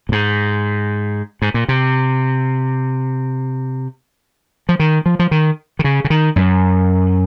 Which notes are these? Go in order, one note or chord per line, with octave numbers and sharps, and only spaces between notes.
A#2
G#2
G#2
A#2
C3
F3
D#3
F3
F3
D#3
D#3
C#3
C#3
D#3
F#2